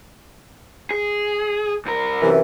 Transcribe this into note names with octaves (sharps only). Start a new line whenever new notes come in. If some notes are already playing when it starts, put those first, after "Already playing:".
G#4
C2 A#4
F#2 C3 E3